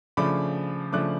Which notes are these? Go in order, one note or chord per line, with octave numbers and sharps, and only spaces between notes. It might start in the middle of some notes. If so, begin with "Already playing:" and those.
C#3 F3 A3 D4 B5 D6
C#3 F3 A3 D4 D6 F#6